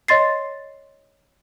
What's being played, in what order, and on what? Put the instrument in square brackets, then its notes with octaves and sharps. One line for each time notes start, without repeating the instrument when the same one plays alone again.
[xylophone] C#5 D#5 C6 A6 C7